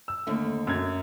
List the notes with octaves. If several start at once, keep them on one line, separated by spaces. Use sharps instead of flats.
E6
D#2 D3 A3
F#2 G#6